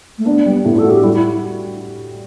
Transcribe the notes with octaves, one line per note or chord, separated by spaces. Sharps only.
A3
B3 D4
G3 B3
A2 B3
A4
F#4
G4
G3 E4
E4